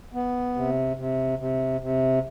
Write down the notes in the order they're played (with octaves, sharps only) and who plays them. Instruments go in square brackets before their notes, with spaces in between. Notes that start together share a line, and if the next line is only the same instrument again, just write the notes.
[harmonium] B3
C3
C3
C3
C3